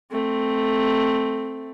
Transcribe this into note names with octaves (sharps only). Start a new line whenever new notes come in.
A3 C4